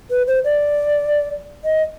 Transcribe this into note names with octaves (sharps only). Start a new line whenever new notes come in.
B4
C5
D5
D#5